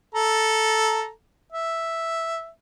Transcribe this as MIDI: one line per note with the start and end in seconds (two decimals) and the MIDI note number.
0.15 1.09 69
0.15 1.09 82
1.52 2.49 76